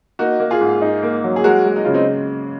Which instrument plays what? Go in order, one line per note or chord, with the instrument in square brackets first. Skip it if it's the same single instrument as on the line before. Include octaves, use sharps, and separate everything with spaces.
[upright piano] A#3 [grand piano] D#4 F#4
[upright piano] A#3
[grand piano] F4 G#4
[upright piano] G#2
D#4
A#3
F#3
[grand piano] G#4
[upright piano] G#3 [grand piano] F#4 A#4
[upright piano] G#3
[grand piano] D#4
[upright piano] C#3 [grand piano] F4
[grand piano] C4 D#4